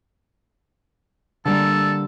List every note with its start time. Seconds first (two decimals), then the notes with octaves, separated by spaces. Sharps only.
1.46 D3 G3 A#3 A4